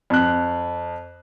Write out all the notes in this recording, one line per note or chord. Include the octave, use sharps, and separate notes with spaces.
F2 F#6